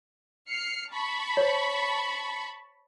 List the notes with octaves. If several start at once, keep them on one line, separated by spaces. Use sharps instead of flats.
F6 C7 C#7
A5 B5 C#6
C5 C#5